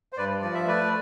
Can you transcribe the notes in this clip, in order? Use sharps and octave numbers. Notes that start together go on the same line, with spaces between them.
C5
G2 B4 D5
F3 D5
E5
A3 B4 D5